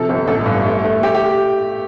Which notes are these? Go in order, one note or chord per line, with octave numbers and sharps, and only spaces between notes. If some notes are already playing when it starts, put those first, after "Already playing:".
Already playing: C3 F3 A4
G1
A1 A4
G2
A3
A3
A3 G4
G4